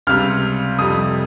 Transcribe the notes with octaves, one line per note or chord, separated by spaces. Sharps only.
C#2 C3 G3 F6
F2 C3 G3 D#6